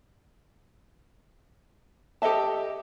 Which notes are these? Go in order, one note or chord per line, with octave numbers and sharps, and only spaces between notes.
G4 A4 D#5 E5 A5